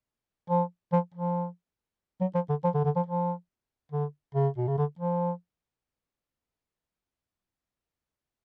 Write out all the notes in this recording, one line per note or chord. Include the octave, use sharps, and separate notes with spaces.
F3
F3
F3
F#3
F3
D3
F3
D3
D3
F3
F3
D3
C#3
B2
C#3
D3
F3